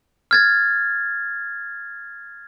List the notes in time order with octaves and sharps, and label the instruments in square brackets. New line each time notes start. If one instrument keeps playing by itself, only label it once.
[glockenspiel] F6 G#6 A6